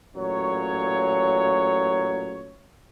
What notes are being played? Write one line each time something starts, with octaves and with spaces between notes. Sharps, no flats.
A1 A#2 F#3 C#5